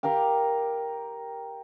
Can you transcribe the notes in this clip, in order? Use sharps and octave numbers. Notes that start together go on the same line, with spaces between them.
G4 A#4 F5 G5